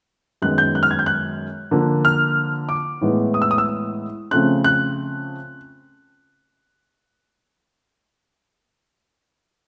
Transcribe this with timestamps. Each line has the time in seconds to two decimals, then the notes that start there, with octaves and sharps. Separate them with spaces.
0.42 F#2 D#3 G#3 B3 F#6
0.58 G6
0.75 F#6
0.83 F6
0.91 G#6
0.99 G6
1.06 F#6
1.71 D3 F3 A#3
2.05 F6
2.69 D6
3.01 A2 E3 G#3 B3
3.34 D#6
3.42 E6
3.51 D#6
3.58 E6
4.31 C#3 F3 A3 C4 F#6
4.64 F#6